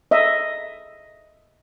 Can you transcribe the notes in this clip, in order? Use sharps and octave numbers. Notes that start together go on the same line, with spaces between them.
D#5 E5